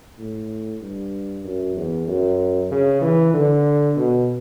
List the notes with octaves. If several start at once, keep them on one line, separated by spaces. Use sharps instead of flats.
A2
G2
F#2
E2
F#2
C#3
E3
D3
B2